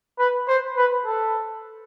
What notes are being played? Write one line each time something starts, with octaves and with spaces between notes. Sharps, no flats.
B4
C5
B4
A4